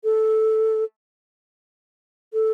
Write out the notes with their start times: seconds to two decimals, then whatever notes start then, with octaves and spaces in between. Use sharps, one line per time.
0.04 A4
2.33 A4